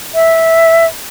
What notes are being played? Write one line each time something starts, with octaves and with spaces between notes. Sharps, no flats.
E5